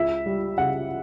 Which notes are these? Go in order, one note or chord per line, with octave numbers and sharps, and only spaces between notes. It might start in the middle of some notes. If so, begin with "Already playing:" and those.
Already playing: C#2 E5
G3
C#3 F#5